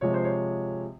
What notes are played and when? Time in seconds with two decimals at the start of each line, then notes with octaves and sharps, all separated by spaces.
0.01 C3 F3 G#3 C#5
0.14 C5
0.24 C#5